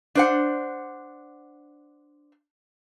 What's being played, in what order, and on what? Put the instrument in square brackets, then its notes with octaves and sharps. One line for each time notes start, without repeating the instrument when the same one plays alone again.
[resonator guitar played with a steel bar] D4 C5 F#5